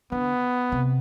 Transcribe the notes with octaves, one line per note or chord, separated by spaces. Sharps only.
D3 B3
C3